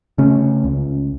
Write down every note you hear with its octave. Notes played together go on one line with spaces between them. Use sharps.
C#3 A3 C#4
C#2